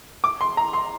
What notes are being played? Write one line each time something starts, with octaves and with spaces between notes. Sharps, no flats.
D6
C6
A#5
C6